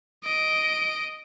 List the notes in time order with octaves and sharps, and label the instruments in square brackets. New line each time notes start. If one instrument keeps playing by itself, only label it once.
[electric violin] D#5 D7